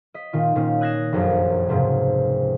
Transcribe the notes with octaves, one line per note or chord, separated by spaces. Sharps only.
D#5 B6
A#2 D#3 F4
A#2 D#3 C#4
D#6 F#6 G#6 A#6 C7 E7
F1 A#1 F#2
C#2 G#2 C3